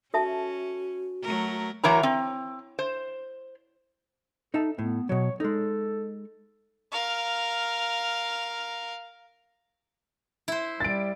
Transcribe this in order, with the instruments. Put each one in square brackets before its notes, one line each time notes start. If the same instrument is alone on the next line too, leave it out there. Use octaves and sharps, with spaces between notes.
[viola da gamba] C#4 [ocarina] F#4 [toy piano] A4 E5 A5
[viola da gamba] F#3 A3 A#4
[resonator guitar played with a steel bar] E3 F#3 A#4 C#5 A#5
C4
C5
[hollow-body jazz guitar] D#4 E5 A5 [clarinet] A4
[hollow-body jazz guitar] A2 [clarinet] B3
[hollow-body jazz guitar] B2 F#3 [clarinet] C#5
[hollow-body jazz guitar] G#3 D#4 [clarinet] A4
[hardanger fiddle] A#4 F5
[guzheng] E4 C5
[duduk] G3 [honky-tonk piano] A6 D7